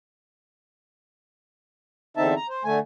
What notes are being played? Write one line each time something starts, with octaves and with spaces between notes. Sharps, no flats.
E2 D3 C4 D#4 E5 A5
A#5
C5
D3 A3 G#5